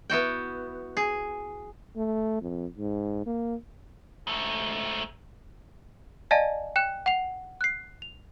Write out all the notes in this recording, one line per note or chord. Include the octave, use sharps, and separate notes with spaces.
B3 E4 F#4 G5
G#4
A3
F2
G#2
A#3
G#2 A3
D5 D#5 F5 G#5 A5
G5 F#6 E7
F#5 C7 F7
F#6 C7
F7